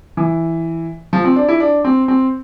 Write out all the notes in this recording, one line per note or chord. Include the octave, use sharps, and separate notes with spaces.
E3
F3
C4
D4
E4
D4
C4
C4